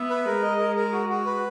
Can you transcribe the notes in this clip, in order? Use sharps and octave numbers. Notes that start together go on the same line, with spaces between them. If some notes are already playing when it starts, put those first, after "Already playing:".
Already playing: B3 E5
B4
G#3 A#4
D#5
A#4
A#4
F#4
F#4
B4